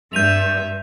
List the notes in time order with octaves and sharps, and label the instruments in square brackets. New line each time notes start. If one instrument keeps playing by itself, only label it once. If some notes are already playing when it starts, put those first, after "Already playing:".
[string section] G2 [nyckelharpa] E5 [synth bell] G6 D#7 F7